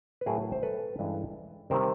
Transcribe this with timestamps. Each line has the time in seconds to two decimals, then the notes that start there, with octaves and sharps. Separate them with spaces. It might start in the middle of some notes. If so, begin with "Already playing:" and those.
0.21 B4
0.26 A2 F#3 A3 G#4 A#4
0.52 C5
0.63 A4 B4
0.98 G2 E3 G#3 C#4
1.70 C3 D#3 G3 C4 A#4 C5